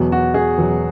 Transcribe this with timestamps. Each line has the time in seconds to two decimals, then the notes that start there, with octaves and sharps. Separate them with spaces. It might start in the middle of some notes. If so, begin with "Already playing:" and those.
Already playing: E2 B2 F#3
0.12 F#4
0.34 G#4
0.58 E2 B2 F#3